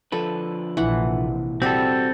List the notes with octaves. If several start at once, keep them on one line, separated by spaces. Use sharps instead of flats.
D3 F3 A4 B4
A#1 C3 E3 F#5
G3 C4 F#4 A4 B5